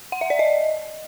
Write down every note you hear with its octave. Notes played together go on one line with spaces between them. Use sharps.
F#5
E5
D5
D#5